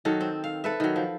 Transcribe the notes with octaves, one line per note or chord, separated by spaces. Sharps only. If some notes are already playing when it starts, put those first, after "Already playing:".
D#3 F#3 A4
C4
F5
A4 B4 E5
D#3 F#3
F3